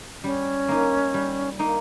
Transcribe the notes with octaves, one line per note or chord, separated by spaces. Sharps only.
G3 C#4
A#3 D#4
G3
A#3 D#4